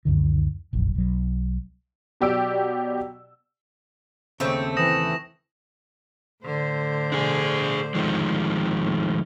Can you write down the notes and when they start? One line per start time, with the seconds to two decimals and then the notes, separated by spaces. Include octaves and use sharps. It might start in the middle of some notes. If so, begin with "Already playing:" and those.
0.05 C#2 F#2 D3 D#3
0.73 F1 A#1 F#2
0.95 B1 F#3
2.21 B2 F#3 G4 D5 E6 D7
4.40 D#2 C#3 A3 C4
4.77 E3 D#6 A#6 E7
6.45 A2 D3 C5
7.12 D4 G#4
7.95 D#3 F3 G#3
8.82 A2